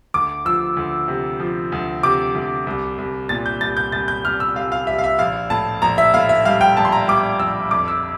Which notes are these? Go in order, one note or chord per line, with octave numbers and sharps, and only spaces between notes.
D2 D6
F3 E6
D2
C3
F3
D2
C3 D6
D2
C2
C2
A#2 A6
G6
C2 A6
G6
C2 A6
G6
C2 F6
E6
C2 F5
F5
C2 E5
F5
E5
A#1 F5
A2 A5
A#1 A#5
E5
A2 F5
E5
G3 F5
G5
A#1 A5
C6
A#5
G3 D6
A#1 E6
F2 D6
E6